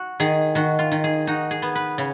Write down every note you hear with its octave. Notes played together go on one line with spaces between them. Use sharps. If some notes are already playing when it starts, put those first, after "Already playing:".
Already playing: F#4
D#3 G#4
D#3 F#4
F4
D#3
G#4
D#4 F#4
G#4
B3
B4
C#3